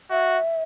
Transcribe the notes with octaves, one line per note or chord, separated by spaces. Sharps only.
F#4 E5